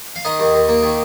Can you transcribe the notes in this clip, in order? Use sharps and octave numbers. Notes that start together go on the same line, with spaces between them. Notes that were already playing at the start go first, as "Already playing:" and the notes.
F5
D#3 D#5
D#2
D#2
A#3
D#3